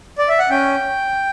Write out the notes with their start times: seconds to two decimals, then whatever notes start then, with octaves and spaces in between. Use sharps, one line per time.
0.18 D5
0.29 E5
0.39 F#5
0.50 C#4 G5